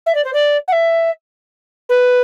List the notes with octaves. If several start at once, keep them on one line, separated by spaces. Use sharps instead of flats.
E5
D5
C5
D5
F#5
E5
B4